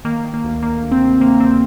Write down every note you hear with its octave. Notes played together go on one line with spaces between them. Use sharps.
D#3 A#3
D#3
A#3
D2
D2 A#3
D2
C4
C3
C3 A#3
D2 C4